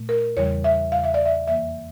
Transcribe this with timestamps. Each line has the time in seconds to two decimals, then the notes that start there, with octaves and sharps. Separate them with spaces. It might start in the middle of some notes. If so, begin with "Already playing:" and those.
Already playing: A#2 A3
0.09 A#4
0.37 E2 C#3 E3 G3 C#5
0.64 E5
0.92 E2 C#3 G3 F5
1.04 E5
1.14 D5
1.25 E5
1.47 F2 E3 A#3 E5